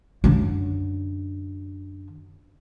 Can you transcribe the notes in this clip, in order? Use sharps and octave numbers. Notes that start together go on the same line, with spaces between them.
F#2 D3